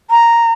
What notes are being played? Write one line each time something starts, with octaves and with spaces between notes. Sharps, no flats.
A#5